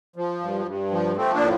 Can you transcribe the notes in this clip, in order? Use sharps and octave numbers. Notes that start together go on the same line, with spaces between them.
F3
G2
G2
F3
F3 A3 C4
A#3 D4
A2